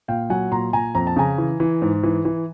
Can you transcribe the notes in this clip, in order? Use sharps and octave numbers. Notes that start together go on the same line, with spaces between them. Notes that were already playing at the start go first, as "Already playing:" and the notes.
A#2 F5 G5
F#3 F#5 G#5
A#2 A#5 C6
A#2 G#5 A#5
F2 A#5
A5
C#3 G#5 A#5
E3
E3
G#2
E3
E3